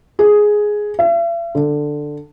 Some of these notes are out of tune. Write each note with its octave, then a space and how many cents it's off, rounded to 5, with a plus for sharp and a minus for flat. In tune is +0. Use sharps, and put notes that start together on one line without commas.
G#4 +5
E5 +45
D3 +10